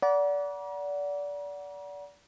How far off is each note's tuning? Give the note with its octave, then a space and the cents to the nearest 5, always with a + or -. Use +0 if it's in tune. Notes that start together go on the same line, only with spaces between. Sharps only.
D5 -25 F#5 +0 A#5 +45